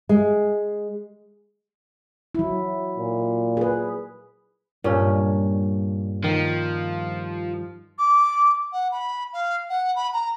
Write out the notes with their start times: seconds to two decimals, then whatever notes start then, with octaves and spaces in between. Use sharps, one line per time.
0.09 G#3
2.35 F#3 E4
2.98 A#2
3.57 G#4 B4
4.84 G2 A#2 C#4
6.24 D#3 F3
7.98 D6
8.72 F#5
8.91 B5
9.33 F5
9.69 F#5
9.95 B5
10.13 A#5